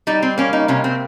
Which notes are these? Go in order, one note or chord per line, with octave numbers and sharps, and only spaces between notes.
G3 D#4
C4
A#3 C#4
D#4
C3 C#4
C4